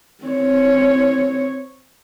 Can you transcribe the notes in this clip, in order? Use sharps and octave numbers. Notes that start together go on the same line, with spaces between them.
C4 C#5